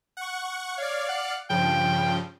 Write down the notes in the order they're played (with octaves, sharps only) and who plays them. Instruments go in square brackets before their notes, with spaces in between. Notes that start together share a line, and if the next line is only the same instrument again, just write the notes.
[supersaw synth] F#5 C#6
[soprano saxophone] C#5 [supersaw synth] D5 F5
[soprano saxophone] F#5
[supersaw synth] G2 C#3 F3 [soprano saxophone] G5